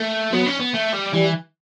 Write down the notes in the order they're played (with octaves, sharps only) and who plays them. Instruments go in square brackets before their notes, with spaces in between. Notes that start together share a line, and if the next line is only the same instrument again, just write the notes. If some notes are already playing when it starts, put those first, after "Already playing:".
Already playing: [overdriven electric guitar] A3
[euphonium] F#3 [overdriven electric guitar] B3
[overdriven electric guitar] C#4
B3
A3
G3
[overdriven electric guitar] E3 [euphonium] G3